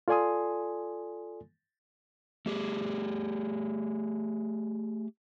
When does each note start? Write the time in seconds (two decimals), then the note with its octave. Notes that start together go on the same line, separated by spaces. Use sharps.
0.08 F4 A4 D5 G#5 C6 D#6
2.46 A3 G4 G#4